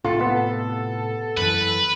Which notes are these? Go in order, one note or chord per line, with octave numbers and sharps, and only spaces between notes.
A2 C3 F4 A4
B3
F#2 E3 B4